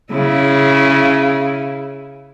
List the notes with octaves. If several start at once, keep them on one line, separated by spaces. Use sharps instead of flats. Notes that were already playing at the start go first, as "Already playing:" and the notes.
C#3 E4